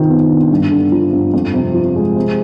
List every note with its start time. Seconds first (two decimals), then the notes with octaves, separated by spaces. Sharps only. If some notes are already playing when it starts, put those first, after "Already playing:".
Already playing: C3 D#3 C4 F4
0.09 B3
0.30 D4
0.51 G2
0.71 D3
0.92 F3
1.13 G2
1.34 F2
1.54 C3
1.74 F3
1.96 G#3
2.16 C3